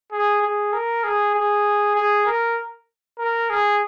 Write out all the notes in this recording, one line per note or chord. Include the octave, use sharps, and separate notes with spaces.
G#4
G#4
A#4
G#4
G#4
G#4
A#4
A#4
G#4